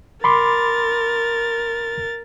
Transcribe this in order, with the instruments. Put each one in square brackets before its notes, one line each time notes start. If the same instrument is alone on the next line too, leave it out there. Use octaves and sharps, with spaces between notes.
[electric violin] A#4 A6 [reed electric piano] B5 C6 D6